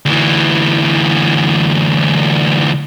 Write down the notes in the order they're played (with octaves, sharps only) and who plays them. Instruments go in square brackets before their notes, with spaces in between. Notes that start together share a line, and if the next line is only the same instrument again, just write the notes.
[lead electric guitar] D2 E3